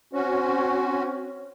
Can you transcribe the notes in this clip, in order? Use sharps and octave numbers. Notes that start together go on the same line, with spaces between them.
C4 C#4 F#4 C5 C#5